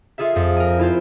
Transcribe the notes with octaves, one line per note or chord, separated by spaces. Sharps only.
F4 G#4 A4 E5
F2
A#4 G#5
E4 F4 C5